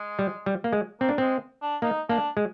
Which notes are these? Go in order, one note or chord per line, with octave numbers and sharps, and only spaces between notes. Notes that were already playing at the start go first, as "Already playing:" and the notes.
Already playing: G#3
G3
G3
A#3
G#3
A#3 C4
D4
G#3 C4
D4
A#3 D#4
A#3 D4
G#3